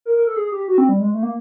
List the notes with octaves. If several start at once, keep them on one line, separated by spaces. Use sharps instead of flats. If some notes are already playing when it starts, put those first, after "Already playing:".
A#4
A#4
A4
G#4
G4
F#4
C4
G3
G#3
A3
A#3